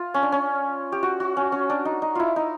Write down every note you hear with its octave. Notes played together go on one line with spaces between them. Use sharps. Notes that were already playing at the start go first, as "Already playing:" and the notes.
Already playing: F4
C#4
D4
C#4
G4
F#4
F#4
C#4
C#4
D4
D#4
D#4
E4 F4
D#4